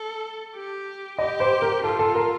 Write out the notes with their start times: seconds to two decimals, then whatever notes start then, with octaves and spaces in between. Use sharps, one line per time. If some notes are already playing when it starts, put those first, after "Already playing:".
Already playing: A4
0.55 G4
1.18 G4 D#5
1.40 C5
1.62 A#4
1.84 F4 A4
1.99 A4
2.15 A#4